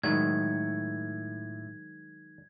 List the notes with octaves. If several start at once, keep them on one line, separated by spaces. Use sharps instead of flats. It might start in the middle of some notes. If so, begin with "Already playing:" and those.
A2 D#3 F#3 G#3 G#6